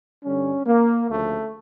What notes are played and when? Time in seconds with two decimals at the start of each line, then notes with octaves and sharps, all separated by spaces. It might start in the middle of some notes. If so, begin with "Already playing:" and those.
0.23 G2 D3 G3 C#4
0.66 A#3
1.08 D2 C#3 F3 A3